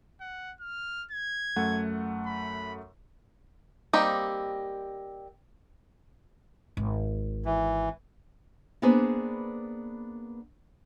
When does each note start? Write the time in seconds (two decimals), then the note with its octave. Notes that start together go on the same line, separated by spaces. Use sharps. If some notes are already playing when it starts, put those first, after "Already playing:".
0.21 F#5
0.61 F6
1.11 G#6
1.56 F#2 A3 F#5
2.27 B5
3.93 G3 A#3 C4 D#4 G4
6.77 G#1
7.45 E3
8.82 A#3 B3 D4 G#4 B4 C5